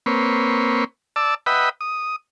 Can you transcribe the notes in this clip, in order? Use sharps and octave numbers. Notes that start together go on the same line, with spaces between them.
A#3 C4 B4 C#5
D5 A5 E6
B4 D#5 E5 F#5 G5 B5
D#6